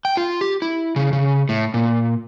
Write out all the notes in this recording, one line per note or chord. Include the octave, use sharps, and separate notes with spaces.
G5
F4
G4
E4
C#3
C#3
A2
A#2